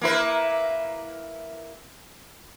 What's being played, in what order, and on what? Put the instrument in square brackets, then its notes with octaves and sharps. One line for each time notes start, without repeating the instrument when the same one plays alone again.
[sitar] A#3 E4 B4